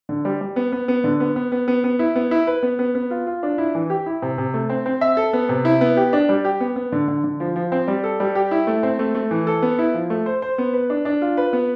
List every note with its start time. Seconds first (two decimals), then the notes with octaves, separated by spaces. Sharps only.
0.09 D3
0.25 G3
0.41 G3
0.56 B3
0.72 B3
0.88 B3
1.04 D3
1.20 B3
1.36 B3
1.52 B3
1.68 B3
1.84 B3
1.99 E4
2.16 B3
2.31 E4
2.47 B4
2.63 B3
2.79 B3
2.95 B3
3.10 F4
3.27 F4
3.43 D4
3.58 E4
3.75 E3
3.90 G4
4.06 E4
4.22 C3
4.38 C3
4.54 A3
4.70 C4
4.86 C4
5.01 E5
5.17 A4
5.33 B3
5.49 C3
5.65 E4
5.81 B3
5.97 G4
6.13 D4
6.29 G3
6.45 G4
6.60 B3
6.76 B3
6.92 D3
7.08 D3
7.24 D3
7.40 F3
7.56 F3
7.72 C4
7.88 G3
8.04 A4
8.20 G3
8.35 G4
8.51 E4
8.67 A3
8.83 C4
8.99 A3
9.15 A3
9.31 E3
9.47 A4
9.62 B3
9.79 E4
9.94 F3
10.10 A3
10.26 C5
10.42 C5
10.58 B3
10.73 B4
10.90 D4
11.05 D4
11.21 F4
11.37 B4
11.53 B3